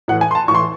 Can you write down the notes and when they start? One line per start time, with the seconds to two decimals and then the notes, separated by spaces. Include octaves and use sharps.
0.08 A2 E3 F#5
0.21 G#5
0.31 C6
0.35 A5
0.48 A2 C#6
0.51 E3 C6